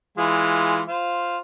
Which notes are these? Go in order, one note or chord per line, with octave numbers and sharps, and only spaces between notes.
E3 G#3 F4
F4 C5